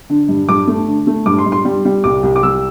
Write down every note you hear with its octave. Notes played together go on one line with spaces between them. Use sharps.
D3
G2
G2 D6
A3
D3
A3
G2 D6
C6
G2
C6
G3
G3
C2 D6
C2
D6
C2 E6